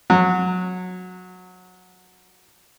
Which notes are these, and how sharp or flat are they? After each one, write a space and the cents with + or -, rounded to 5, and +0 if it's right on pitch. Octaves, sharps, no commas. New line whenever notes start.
F#3 -20